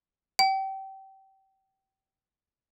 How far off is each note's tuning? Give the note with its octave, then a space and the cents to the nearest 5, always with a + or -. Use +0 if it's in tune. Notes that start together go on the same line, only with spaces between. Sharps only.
G5 -25